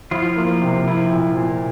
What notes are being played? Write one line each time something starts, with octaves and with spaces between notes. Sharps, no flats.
F3 E4 F4
A#3
C3
E4
A#2
A#2